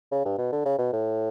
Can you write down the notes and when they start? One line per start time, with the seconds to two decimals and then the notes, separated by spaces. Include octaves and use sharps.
0.11 C#3
0.25 G2
0.38 B2
0.52 D3
0.65 C#3
0.78 B2
0.93 A2